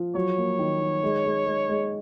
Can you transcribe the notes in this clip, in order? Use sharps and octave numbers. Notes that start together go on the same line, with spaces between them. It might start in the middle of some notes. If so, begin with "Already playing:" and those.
Already playing: F3
F#3 C#5
A#3
D#3
D#3
G#3
G#3
G#3
G#3